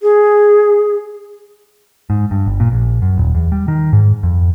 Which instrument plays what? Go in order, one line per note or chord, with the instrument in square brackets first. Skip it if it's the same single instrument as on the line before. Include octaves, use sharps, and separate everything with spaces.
[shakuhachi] G#4
[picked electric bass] G#2
G2
G1
A#2
A#1
F#2
D#1
E2
G3
D#3
G#2
F2